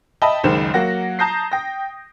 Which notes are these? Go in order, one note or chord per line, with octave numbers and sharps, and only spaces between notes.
D#5 E5 G5 A5 B5
F#1 C#2 D#3 C5 E7
F#3 A#3 F#5 A#6
A5 A#5 D#6 G6 A#6 C7
G5 A#6